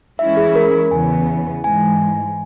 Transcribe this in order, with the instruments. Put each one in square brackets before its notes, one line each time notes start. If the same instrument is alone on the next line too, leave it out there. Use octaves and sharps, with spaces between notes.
[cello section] E3 G#3 C#4 E4 [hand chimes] E5
[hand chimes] G#4
A#4
[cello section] E2 C#3 E3 B3 [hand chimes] G#5
[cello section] G#2 E3 G#3 [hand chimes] G#5